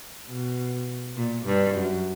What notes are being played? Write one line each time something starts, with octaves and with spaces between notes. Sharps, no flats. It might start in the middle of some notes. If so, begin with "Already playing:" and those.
B2
A#2
G2
F#2